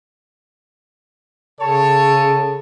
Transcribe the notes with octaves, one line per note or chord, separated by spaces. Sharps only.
C#3 A4 C#5 A5